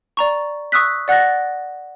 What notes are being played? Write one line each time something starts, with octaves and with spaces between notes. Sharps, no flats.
D5 A#5 C#6
C#6 D#6 E6 F#6 B6
D5 F#5 F#6 A6 A#6